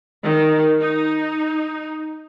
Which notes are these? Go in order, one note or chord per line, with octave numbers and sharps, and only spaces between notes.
D#3
D#4